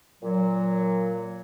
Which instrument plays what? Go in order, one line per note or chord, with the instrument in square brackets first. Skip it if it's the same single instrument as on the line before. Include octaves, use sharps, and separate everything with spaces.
[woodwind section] A#2 F#3